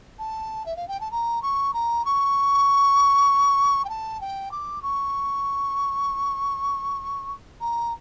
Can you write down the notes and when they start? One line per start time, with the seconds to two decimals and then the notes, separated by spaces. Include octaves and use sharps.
0.19 A5
0.66 E5
0.76 F5
0.88 G5
1.01 A5
1.11 A#5
1.42 C#6
1.74 A#5
2.05 C#6
3.85 G5
3.89 A5
4.21 G5
4.51 D6
4.82 C#6
7.61 A#5